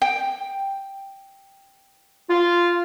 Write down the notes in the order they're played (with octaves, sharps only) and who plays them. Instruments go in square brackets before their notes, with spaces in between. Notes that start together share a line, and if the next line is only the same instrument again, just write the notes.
[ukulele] G5
[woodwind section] F4